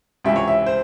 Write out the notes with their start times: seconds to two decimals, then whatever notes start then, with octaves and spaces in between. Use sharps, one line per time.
0.25 C#2 C3 E3 E5
0.36 C#5
0.48 E5
0.66 C5